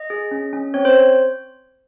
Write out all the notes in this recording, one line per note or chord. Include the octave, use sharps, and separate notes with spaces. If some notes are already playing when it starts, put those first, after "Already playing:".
Already playing: D#5
G#4
C#4
C#4
C4 C#5
C5